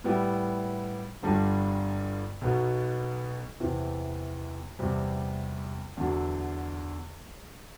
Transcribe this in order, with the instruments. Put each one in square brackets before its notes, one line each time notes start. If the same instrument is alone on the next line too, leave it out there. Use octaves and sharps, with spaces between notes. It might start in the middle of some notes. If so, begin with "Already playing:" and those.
[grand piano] A2 G3 B3 E4 G4
G1 G2 D3 G3
B1 B2 F#3 B3
E2 C3 E3
E2 C3 G3
E2 D3 F#3